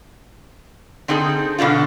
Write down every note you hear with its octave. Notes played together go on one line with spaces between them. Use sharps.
D3 C4 D#4 G#4 A4
B2 D3 D4 F4